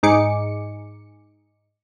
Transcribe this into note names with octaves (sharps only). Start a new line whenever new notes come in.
G#2 D#4 G#4 D6 C#7